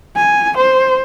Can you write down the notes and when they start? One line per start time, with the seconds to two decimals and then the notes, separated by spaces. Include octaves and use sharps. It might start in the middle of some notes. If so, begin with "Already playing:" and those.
0.16 G#5
0.57 C5